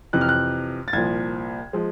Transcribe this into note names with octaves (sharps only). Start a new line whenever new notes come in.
F2 C3 E3 F#6
F6
F#6
A6
C2 A#2 F3 G#6
F3 G#3